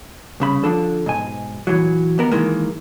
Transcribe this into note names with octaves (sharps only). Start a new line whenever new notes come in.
C2 C#3 B5
D3 F3 D4 A4
G#2 B2 G#5
A#2 E3 F#3
D#2 B3 A#4
D#3 E3 G#3 A#3